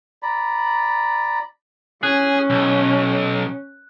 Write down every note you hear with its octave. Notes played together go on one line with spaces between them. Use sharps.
D5 A#5 B5
C#4 G#4 F#6
B1